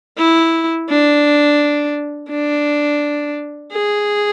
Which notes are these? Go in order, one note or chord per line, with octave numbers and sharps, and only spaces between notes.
E4
D4
D4
G#4